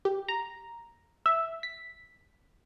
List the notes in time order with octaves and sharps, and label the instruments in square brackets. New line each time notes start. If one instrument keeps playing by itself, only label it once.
[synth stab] G4
A#5
E5
B6